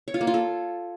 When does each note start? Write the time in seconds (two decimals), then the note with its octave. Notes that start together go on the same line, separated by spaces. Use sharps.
0.08 C#5
0.14 F4
0.21 A#3
0.27 F4
0.34 A4